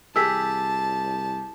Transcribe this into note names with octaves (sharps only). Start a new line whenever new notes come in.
C2 G4 G#4 A5 E6 B6